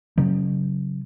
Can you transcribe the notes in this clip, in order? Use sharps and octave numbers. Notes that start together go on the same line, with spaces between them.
C#3 F#3